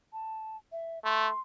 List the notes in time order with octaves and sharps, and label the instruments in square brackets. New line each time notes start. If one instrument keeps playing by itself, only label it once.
[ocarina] A5
E5
[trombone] A3 [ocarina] C6